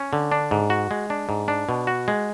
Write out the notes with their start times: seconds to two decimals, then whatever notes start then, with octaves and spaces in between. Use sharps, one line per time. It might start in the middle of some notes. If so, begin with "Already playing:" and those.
Already playing: C#4
0.13 D3
0.32 D4
0.51 G#2
0.70 F#4
0.91 G#3
1.10 D4
1.29 G#2
1.48 D4
1.69 B2
1.87 F#4
2.08 G#3